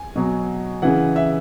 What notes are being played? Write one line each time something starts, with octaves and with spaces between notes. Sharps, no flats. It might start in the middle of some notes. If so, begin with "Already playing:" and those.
Already playing: G#5
B2 F#3
C#3 E3 F#5
E5